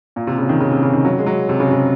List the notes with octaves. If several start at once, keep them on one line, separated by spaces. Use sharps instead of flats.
A#2
C3
C#3
D#3
C#3
C3
C#3
D#3
F#3
G#3
F#3
C3
C#3
C3